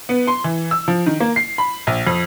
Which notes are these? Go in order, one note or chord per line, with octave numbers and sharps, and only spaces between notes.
B3
C6
E3
E6
F3
D#3
A#3
C7
B5
A#1
F2